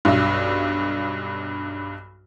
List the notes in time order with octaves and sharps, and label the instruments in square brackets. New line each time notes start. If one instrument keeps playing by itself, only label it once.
[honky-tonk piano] B1 G2